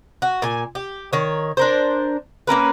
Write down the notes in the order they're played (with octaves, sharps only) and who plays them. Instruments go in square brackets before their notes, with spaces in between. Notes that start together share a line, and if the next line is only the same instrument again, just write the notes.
[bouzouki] F#4
A#2 G#5
G4
D#3 C#5
D4 A#4 C5
A#3 C#4 A#4 B4